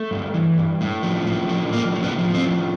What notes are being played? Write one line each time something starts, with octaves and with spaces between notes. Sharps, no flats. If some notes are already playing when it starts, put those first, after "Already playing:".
Already playing: A3
G2
E3
G2
A2
F3
A2
F3
A2 A#3
F3
B3
F3
C4
A2